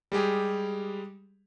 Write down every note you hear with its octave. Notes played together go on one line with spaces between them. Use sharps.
G3 G#3 G4 G#4